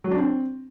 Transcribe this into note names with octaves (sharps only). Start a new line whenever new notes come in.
F#3
D4
C4